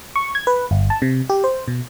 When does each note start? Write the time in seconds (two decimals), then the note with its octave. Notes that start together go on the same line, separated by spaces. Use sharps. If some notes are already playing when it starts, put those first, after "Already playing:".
0.16 C#6
0.35 G#6
0.47 B4
0.71 G1
0.90 A5
1.02 C3
1.30 G4
1.44 C5
1.68 B2